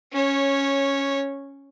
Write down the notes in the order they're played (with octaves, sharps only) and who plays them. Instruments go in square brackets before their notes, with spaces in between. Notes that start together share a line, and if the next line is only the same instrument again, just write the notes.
[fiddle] C#4 C#5